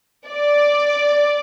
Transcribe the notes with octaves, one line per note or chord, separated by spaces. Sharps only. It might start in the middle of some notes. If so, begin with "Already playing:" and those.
D5